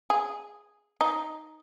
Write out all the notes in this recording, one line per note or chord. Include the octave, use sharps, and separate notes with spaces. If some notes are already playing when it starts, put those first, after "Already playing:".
G#4
D#4